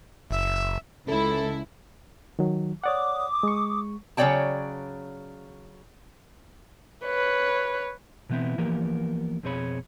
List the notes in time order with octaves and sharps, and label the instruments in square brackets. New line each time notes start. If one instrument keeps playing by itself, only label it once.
[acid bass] F#1 [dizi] E5
[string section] C#2 [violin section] E4 [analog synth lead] A4
[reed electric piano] D#3 F#3
[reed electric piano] C#5 D5 F#5 [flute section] D6 D#6
[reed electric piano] G#3 C#6
[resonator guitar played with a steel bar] C#3 F#3 C#5 D5 G5 A5
[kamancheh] B4 C#5
[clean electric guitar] B2 E3 B3 C4 E4
E3 F3 A#3 B3 G4 A#4
F2 B2 C4 G#4 C#5 B5